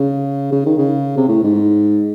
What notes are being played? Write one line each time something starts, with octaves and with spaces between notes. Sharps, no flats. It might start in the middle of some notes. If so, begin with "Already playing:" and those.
Already playing: C#3
C#3
D#3
C#3
C3
A2
G#2